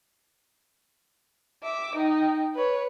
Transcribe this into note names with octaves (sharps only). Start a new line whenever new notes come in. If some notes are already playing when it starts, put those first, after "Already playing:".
E5 D6
D#4 G5
B4 C#5